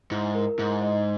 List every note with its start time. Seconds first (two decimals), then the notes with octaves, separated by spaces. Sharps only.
0.11 G#2 E4
0.35 A#4
0.58 G#2 E4
0.82 D#5